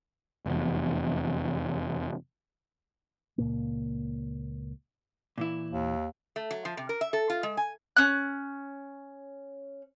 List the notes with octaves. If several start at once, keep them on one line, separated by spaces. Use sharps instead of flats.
F1 E2
C#2 A#2 A#3
A#2 E3 E4
D#2
A3
F#3
F3
C3
A#4
E5
A4
F4
G#3
G#5
C#4 F#6